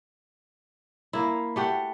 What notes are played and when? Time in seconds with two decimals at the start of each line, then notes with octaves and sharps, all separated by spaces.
1.13 A#3 E4
1.56 A3 G4 F#5